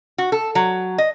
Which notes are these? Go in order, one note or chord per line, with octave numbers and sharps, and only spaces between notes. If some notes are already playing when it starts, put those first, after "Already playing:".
F#4
A4
F#3
D#5